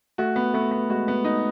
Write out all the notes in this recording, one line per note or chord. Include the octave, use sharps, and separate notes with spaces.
A3 F#4
B3
A3 B3
B3
G#3 F#4
B3
D#4